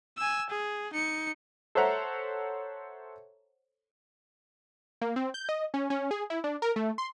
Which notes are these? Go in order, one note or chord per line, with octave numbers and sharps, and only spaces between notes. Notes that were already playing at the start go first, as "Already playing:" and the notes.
G#5 E6
G#4
D#4 C#7
A4 C5 C#5 E5 F#5 A#5
A#3
C4
G6
D#5
C#4
C#4
G#4
E4
D4
A#4
A3
C6